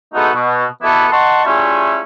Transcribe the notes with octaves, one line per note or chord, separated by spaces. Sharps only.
G#3 A3 B3 D#4 F#4 A4
B2
B2 E3 B3 E4 A4
D#5 F#5 A5 C6 C#6
G3 A3 C#4 E4 F4 G#4